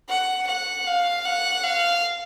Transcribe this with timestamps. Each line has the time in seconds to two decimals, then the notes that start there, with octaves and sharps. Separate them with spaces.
0.09 F#5
0.47 F#5
0.86 F5
1.25 F#5
1.64 F5